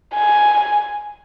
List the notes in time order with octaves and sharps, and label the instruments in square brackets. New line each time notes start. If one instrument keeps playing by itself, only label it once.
[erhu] G#5